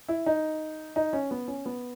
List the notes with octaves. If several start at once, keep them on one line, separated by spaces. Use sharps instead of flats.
E4
D#4
D#4
C#4
B3
C#4
B3